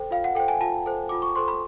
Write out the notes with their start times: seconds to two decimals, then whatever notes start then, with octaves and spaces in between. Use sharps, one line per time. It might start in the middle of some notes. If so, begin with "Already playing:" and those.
Already playing: A4 C5 G5
0.11 F4 F5
0.24 F#5
0.35 A4 C5 G5
0.48 G#5
0.61 F4 A5
0.86 A4 C5
1.09 F4 D6
1.22 C#6
1.35 A4 C5 C6
1.48 B5